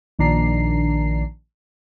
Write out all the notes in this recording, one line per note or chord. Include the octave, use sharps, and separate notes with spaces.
A#1 D#3 D4 D5 A#5 C7